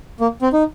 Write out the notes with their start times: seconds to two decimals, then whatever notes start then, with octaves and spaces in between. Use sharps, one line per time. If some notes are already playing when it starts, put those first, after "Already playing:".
0.20 A#3
0.42 C4
0.53 D#4